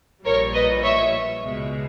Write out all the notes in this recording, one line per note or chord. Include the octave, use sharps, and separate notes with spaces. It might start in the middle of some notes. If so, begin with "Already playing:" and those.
A#1 A#2 G3 A#4 C#5
B4 D#5
C#5 E5
C#2 B2 G#3